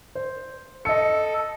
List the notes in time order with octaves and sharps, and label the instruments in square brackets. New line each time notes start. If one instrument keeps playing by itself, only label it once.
[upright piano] C5
[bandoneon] A4 [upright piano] D#5 C#7